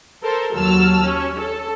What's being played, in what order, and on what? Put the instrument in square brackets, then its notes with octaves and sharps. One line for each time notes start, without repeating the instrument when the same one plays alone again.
[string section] A4 A#4 C5
D#2 F#3 A5 E6 F6
C#4
A4